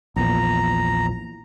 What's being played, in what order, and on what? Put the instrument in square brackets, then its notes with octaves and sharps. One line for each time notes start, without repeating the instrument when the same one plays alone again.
[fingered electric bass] A#1 E2 A#2 [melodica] A#5